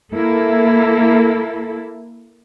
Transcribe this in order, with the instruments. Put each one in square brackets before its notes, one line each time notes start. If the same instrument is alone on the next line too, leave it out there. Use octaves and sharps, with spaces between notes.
[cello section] A#3 E4 A4